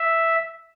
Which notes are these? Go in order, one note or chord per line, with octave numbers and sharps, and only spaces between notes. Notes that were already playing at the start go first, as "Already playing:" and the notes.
Already playing: E5